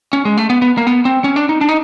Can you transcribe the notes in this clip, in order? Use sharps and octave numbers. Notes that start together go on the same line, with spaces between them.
C#4
G#3
A3
B3
B3
A#3
B3
C4
C#4
D4
D#4
D4
D#4